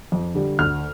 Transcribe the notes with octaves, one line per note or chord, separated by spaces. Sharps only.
F2
D3 G3
D2 F6